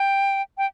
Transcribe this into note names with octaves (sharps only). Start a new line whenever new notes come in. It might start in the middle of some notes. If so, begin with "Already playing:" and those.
Already playing: G5
G5